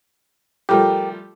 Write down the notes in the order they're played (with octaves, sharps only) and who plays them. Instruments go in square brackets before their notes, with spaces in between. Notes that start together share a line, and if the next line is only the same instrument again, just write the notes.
[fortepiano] F3 G3 A3 [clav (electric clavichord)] G4 A#4